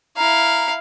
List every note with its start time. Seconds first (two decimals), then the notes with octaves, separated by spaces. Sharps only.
0.17 E4 F5 A#5